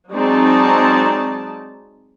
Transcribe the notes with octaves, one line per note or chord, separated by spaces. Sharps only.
F#3 G#3 C4 D#4 D5 A5